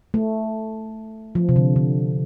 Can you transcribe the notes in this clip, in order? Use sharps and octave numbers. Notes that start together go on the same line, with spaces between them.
A3
F3
C3
D3
D3